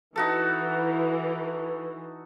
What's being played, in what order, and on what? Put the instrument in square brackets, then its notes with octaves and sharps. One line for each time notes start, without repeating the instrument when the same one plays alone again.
[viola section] E3 [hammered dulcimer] D#4 F#4 A4